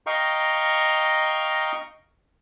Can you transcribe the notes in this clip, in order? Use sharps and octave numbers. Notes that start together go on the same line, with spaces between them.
D#5 F5 G5 A#5 C#6